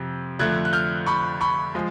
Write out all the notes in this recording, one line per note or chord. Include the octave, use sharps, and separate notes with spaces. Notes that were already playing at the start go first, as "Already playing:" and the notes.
Already playing: F2 C3
F2 D3 F3 A3 F#6 G#6
F#6
F6 G6
B5 C#6
B5 C#6
F3 G#3